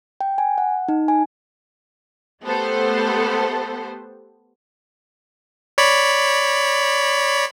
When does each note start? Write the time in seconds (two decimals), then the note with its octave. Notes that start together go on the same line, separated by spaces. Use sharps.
0.21 G5
0.38 G#5
0.58 F#5
0.88 D#4
1.08 G#5
2.45 A3 B3 G4 A4 C5
5.78 C#5 D5 B5